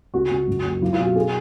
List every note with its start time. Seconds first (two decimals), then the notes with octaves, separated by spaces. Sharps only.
0.14 C#2 F#4
0.30 C#2
0.48 F#2
0.65 F#1
0.82 F#3 F4
0.93 F4
0.99 B2
1.05 F#4
1.15 G#4